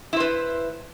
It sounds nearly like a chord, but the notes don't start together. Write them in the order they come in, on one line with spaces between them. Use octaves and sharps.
E4 C5 B4